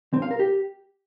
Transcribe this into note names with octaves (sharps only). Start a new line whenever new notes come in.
C4
F5
A#4
G4